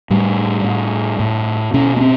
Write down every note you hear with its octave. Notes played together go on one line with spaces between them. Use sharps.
A2 G3
A2
A2
B2 C#4
B3
C4